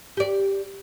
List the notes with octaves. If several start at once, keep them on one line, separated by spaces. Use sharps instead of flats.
G4 D5